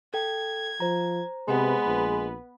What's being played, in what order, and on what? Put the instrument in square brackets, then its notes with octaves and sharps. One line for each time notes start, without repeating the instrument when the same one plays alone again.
[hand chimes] A4 G5 [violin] G#6
[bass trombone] F3 [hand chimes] C5 A#5
[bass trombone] C3 [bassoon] G#3 [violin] B3 B4
[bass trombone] A#1